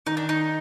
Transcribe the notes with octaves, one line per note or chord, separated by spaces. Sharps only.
D#3 D#4
D4
D#4